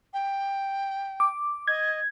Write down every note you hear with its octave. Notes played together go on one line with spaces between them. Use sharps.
G5
D6
D#5 G#6